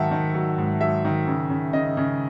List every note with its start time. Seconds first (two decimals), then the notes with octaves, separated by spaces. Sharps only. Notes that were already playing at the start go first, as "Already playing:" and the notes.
Already playing: G#2 D#3 F#3 E5 F#5 A5
0.11 D#3
0.35 F#3
0.58 G#2
0.81 F#3 E5
1.05 D#3
1.27 C#3
1.50 C#3
1.73 C#3 D#5
1.97 C#3